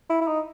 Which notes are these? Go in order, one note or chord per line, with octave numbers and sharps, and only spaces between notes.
E4
E4
D#4